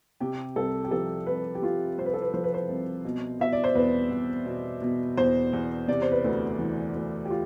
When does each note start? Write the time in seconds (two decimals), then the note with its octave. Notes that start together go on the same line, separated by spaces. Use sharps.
0.20 C3 G4
0.56 C2 A4
0.84 G4
0.91 F3 A4
1.27 C2 B4
1.55 G4
1.62 C3 F4
1.97 C2 C5
2.06 B4
2.14 A4
2.22 B4
2.34 F3 C5
2.44 B4
2.54 C5
2.68 C2
3.05 B2
3.39 B2 E5
3.53 D5
3.64 C5
3.75 E2 B4
4.11 E2
4.46 B2
4.82 B2
5.17 E2 C5
5.53 E2
5.88 C3 D5
6.02 C5
6.12 B4
6.24 D2
6.59 E3
6.95 D2
7.25 G4
7.30 F4